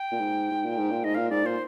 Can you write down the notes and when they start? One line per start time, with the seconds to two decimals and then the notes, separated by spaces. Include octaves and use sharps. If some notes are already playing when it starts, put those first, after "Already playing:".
Already playing: G5
0.11 A#2
0.19 G#2
0.51 G#2
0.64 A#2
0.77 G#2
0.91 A#2
1.04 G#2 D#5
1.15 A#2 F5
1.30 G#2 D5
1.43 A#2 C5